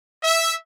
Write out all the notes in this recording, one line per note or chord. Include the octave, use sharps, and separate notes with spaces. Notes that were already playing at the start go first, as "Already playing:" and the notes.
E5